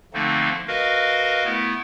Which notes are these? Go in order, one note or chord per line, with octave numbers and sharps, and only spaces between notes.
D3 F3 A3 A#3 C4 D#4
F#4 A#4 B4 D#5 F5
A3 B3 E4